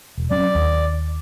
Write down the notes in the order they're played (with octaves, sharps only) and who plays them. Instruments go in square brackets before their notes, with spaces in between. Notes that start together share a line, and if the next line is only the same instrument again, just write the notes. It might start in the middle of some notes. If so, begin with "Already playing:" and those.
[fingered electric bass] E1
[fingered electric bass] F#3 C4 C#4 [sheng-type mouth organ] D5
[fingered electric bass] D#2